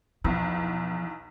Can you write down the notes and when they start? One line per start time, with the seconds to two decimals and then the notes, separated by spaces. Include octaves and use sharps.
0.24 B1 E2 F3